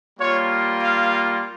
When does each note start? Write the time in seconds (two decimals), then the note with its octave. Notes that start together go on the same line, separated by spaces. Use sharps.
0.19 G3 A#3 F4 C#5
0.82 F5